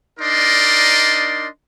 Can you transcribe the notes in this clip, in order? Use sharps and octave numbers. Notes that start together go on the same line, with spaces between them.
D4 D#4 A#4 D5 D#5 C6